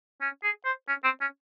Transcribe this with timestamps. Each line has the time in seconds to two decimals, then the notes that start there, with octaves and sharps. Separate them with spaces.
0.22 C#4
0.43 G#4
0.65 C5
0.88 C#4
1.04 C4
1.21 C#4